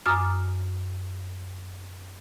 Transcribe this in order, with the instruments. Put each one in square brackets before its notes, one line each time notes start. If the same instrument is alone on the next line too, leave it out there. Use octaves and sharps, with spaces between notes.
[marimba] F#2 G#5 A#5 D6 D#6 F6